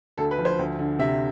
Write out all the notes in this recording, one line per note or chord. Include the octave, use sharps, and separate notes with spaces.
D2 A4
B4
F3
C5
D2
D3
C3 E5